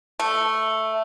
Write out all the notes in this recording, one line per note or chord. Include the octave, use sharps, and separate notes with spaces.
A3